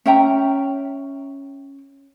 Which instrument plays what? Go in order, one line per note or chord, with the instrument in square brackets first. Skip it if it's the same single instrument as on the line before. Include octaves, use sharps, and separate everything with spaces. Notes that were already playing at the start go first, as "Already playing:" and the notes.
[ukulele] C#4 E5 G5 A#5